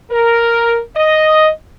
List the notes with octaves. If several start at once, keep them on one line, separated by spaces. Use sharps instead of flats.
A#4
D#5